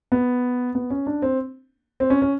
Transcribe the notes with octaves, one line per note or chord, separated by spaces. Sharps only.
B3
B3
C#4
D4
C4
C4
C#4
C#4